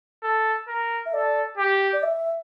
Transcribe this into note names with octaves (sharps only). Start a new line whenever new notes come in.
A4
A#4
E5
A4 D5
G4
D5
E5